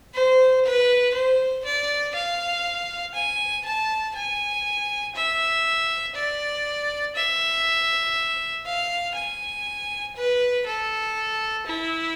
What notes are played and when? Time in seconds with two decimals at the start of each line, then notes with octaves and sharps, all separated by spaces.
0.14 C5
0.65 B4
1.14 C5
1.65 D5
2.15 F5
3.15 G#5
3.65 A5
4.16 G#5
5.16 E5
6.15 D5
7.16 E5
8.66 F5
9.16 G#5
10.16 B4
10.66 A4
11.66 E4